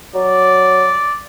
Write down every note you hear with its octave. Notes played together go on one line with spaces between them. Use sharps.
F#3 D5